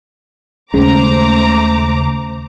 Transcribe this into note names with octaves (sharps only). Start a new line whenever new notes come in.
D#2 C#3 G#3 A3 C5 A#5 D6